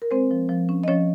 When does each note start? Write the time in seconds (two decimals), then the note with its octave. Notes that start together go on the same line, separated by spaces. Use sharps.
0.02 A#4
0.11 G#3 C4 C5
0.31 F3
0.49 F3
0.69 C#4
0.84 D#5
0.88 F3 C#4 C#5